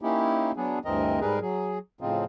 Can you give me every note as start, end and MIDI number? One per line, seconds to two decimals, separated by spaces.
0.02 0.52 58
0.02 0.52 61
0.02 0.52 63
0.02 0.52 64
0.02 0.52 67
0.57 0.79 54
0.57 0.79 59
0.57 0.79 62
0.57 0.79 68
0.85 1.20 38
0.85 1.20 43
0.85 1.20 52
0.85 1.20 60
0.85 1.20 70
0.85 1.20 75
1.21 1.39 44
1.21 1.39 55
1.21 1.39 68
1.21 1.39 70
1.21 1.39 71
1.42 1.78 54
1.42 1.78 68
2.01 2.24 45
2.01 2.24 49
2.01 2.24 53
2.01 2.24 60
2.01 2.24 63
2.01 2.24 65